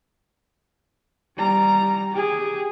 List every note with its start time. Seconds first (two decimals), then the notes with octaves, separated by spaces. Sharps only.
1.37 G3 A#5
2.12 G4 G#4